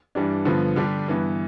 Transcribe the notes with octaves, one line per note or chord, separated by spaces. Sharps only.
G2 E3 G3 D4
G2 D3 F3 B3
D3 G3 D4 G4
G2 E3 B3